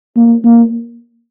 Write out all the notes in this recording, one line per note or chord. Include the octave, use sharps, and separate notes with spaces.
A#3
A#3